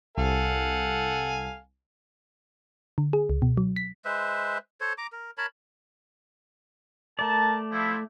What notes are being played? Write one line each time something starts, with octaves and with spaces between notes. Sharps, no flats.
C2 A4 F5 F#5 G#5
D3
G#4
C#2
B2
F#3
B6
G#3 B4 C5 E5
A4 C5 C#5
A#5 D6
A#4
A#4 C#5 A5 B5
A3 A#4 D5 A5
C3 F3 E4